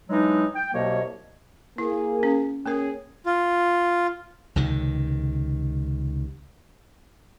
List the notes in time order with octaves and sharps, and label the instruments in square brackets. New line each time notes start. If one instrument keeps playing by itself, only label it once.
[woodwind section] E3 F#3 G#3 D4 D#4
G5
C2 B2 F#3 A#3 C#5 D#5
[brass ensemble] A#3 G#4 [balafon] E4
[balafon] C#4
[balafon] A#3 A#4 [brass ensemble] C#4 G#4
[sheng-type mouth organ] F4
[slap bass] C#2 C3 D#3